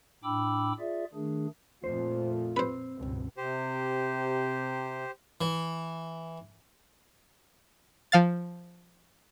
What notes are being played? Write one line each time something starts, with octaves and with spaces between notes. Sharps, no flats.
A2 D4 G5 B5 D6 E6
F4 G#4 D5 E5
D#3 A3 D4 G#4
F2 A#2 F3 A3 F4 C5
C4 B4 C5
C#2 G2 B2
C3 G4 C5
E3
F3 F5 A6